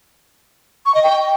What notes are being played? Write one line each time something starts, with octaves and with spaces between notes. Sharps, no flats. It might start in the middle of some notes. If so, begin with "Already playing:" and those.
C#6
D#5
G5